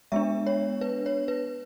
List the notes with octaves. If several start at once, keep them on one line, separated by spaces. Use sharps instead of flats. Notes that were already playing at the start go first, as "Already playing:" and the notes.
G#3 B3 D4 E5
C#5
B4
C#5
B4